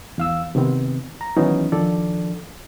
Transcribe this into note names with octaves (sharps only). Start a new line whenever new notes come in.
E2 F5 E6
C3 D#3 B3 C4
A#5
D#3 E3 F#3 B3 C#4 D#4
D#3 F3 D4 A4 D5